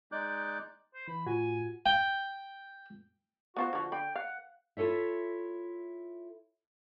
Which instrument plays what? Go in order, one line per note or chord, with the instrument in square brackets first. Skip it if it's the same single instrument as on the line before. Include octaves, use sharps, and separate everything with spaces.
[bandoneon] G#3 D#4 D5 D6 F#6 G6
[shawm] C5
[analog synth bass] E3 [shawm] B5
[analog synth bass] A2 [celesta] F4 [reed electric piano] F#4 [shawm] G#5
[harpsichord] G5
[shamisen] B3 F4 C5 [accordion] F#4
[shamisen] D3 F3
[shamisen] D3 B5 [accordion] G5
[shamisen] F5 [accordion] F#5
[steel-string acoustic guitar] E4 F4 A4 C#5 E5